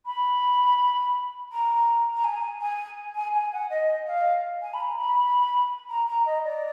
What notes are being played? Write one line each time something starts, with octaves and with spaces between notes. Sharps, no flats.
B5
A#5
A#5
G#5
G#5
G#5
G#5
F#5
D#5
F5
G#5
B5
A#5
B5
A#5
A#5
D#5
D5